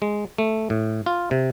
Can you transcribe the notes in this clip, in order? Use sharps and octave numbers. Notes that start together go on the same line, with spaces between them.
G#3
A3
A2
F4
C3